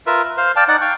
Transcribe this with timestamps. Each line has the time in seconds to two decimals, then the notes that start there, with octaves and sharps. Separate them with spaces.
0.07 F4 A#4 B4 E5
0.23 B4
0.37 C5 F5
0.56 D5 F5 G5 A5
0.68 D#4 D5 F#5
0.81 F5 G5 C#6